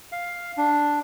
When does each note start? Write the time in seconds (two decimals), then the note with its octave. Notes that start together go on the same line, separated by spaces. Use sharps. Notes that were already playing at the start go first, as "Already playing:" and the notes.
0.12 F5
0.58 D4